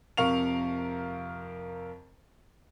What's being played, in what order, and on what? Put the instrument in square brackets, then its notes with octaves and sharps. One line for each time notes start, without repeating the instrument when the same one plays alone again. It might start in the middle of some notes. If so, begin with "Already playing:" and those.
[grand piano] F2 C3 A#4 F5 C#6 F7